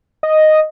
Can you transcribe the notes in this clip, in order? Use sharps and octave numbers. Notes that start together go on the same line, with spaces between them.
D#5